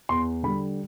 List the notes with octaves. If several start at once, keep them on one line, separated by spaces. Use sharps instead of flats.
E2 C6
D3 G3 B5